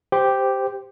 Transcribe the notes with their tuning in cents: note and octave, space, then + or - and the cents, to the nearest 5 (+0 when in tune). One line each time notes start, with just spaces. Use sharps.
G4 +0 C5 -10